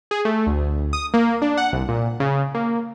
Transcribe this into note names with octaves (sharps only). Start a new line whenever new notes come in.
G#4
A3
D2
D#6
A#3
D4
F#5
C2
A#2
C#3
A#3